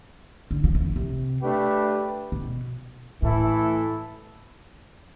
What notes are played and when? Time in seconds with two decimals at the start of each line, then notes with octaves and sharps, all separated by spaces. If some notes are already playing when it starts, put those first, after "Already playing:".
0.51 D3
0.64 F3
0.75 E3
0.85 D3
0.96 C3
1.41 A3 D4 G4 B4
2.32 B2
3.22 A2 E3 A3 E4 A4